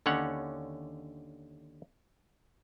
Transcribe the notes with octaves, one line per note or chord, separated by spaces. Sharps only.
D#2 D3 C#4 C#5 F#5